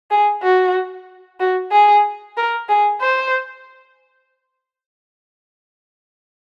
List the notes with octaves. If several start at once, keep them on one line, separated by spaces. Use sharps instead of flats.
G#4
F#4
F#4
G#4
A#4
G#4
C5